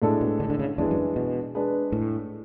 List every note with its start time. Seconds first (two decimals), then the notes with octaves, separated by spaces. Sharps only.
0.02 A2 G#3 D4 A4
0.21 B2
0.40 D3
0.50 D3
0.59 C#3
0.78 E2 E3 G#3 D4
0.91 F#2
1.16 B2
1.55 G#3 D4 G#4 B4
1.92 A2